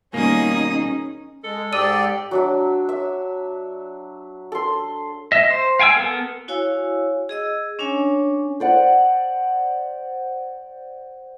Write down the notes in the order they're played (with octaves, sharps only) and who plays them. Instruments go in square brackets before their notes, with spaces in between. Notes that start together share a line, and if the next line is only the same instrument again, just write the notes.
[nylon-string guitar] B2 D#3 G3 [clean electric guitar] A#3 [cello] C#4 D#4 [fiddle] G#4 D#6
[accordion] G#3 [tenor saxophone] A4
[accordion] G#2 D5 [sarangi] G4 [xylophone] D#6 E6 D#7
[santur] F#3 D4 E5
E5
A4 C6
[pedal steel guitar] D#5 E5
C5
F5 G5 G#5 A#5 E6
B3 A4 A#4
[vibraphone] E4 F#4 C#5 F5 G#5 E6
G#4 D#5 E6
C#4 D4 C#5 G#5
[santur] C5 D5 F#5